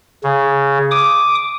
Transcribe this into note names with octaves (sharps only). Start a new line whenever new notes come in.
C#3
D6 D#6